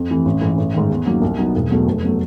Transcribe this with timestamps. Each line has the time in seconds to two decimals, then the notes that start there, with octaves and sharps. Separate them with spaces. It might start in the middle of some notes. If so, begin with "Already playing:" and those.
Already playing: F2
0.09 C3 E3 A3
0.26 A1
0.41 G#2 E3 G#3
0.57 A1
0.74 G#2 D#3
0.90 E2
1.06 C#3 F#3 A#3 D#4
1.22 C2
1.38 B2 F#3 B3 D#4
1.55 E1
1.71 E2 B2 F#3 A3
1.87 F1
2.04 B2 F#3 A3